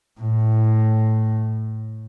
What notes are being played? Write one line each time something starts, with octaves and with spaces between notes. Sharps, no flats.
A2